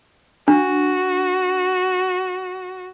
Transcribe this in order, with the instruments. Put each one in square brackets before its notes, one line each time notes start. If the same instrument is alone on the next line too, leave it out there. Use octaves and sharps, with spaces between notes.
[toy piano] D4 [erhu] F#4